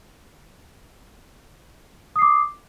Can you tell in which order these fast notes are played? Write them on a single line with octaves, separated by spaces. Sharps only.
D#6 C7 D6